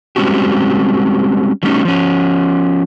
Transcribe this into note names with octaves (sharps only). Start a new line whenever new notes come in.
G3 G#3 C4 C#4 F#4 G4
F#3 G3 A3 C#4 D#4
F3 C#4